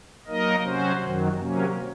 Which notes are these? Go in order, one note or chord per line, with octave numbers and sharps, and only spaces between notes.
F#3 A#3 D#4 A#4 D#5
C3 F#3 C#4 F#4 C5
F#2 D#3 F#3
C3 F#3 A#3 C#4